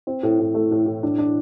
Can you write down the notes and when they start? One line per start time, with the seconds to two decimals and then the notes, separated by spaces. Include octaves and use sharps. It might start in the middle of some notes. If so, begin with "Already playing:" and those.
0.07 C4
0.23 A2
0.40 A2
0.54 A3
0.71 A2
0.86 A2
1.03 D4
1.18 D4